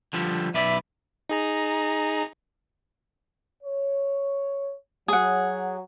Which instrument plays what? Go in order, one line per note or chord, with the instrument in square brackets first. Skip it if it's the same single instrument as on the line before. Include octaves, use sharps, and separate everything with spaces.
[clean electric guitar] D3 F3 G3
[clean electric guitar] B1 B4 D5 [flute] E5
[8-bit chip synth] D#4 G#4 A#5
[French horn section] C#5
[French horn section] F#3 [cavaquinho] G#4 F#5